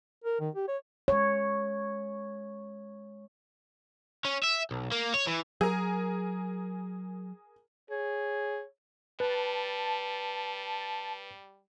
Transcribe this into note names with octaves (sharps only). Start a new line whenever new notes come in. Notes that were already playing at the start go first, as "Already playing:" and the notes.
A#4
D#3
G4
C#5
G#3 C#5
C#4
E5
B1
A#3
C#5
E3
F#3 G#4 A#4
G#4 C#5
G3 B4 A5